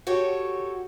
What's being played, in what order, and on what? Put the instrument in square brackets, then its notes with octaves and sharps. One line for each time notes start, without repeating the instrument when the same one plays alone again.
[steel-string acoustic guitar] F#4 G4 A4 C#5